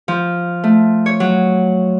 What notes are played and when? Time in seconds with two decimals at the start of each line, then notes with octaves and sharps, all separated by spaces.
0.08 F3
0.64 A3
1.06 C#5
1.20 F#3